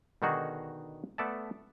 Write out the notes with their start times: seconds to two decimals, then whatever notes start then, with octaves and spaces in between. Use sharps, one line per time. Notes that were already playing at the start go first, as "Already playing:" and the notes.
0.22 B2 D3 D#3 D#4 F#4 G#4
1.18 A3 B3 A4 D5 E5 A5